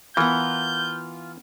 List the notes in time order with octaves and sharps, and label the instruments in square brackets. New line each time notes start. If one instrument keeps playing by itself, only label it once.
[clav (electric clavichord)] E3 [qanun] B3 A#4 [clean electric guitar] F4 [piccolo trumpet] G6